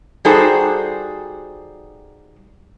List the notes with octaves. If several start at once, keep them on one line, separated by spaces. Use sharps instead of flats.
G3 D#4 F#4 G#4 A4 C5